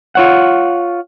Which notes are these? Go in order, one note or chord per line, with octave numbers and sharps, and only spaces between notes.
F4 C#5 F#5